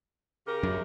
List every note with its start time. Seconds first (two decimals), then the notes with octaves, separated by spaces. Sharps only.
0.46 C#3 G4 A#4
0.63 F#2